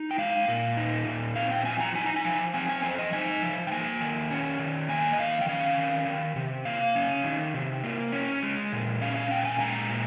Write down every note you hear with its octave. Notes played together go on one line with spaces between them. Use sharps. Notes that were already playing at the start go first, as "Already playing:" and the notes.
Already playing: D#4
G5
G#3 F5
A#2
D#4
A#2
C4 F5
G5
F3 G#5
A#5
D#4 G#5
A#5
G#5
F3
C4 G#5
G#5
F3 C5
D#5
D#4 G#5
F3
G5
A#3 G#5
D#3
C#4
D#3
A#3 G#5
D#5
D#3 F5
G5
C#4 F5
D#3
D#3
C3
A#3 F5
C#4
D#3
C3
A#3
C#4
G#3
A#2
C#4 F5
F5
A#2 G5
G#5
G#3 A#5
A#2